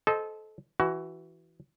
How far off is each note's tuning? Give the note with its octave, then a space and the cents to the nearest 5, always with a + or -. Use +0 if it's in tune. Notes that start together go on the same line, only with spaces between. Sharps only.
A4 -25 C5 +0 D#5 +0
E3 +0 F#4 +20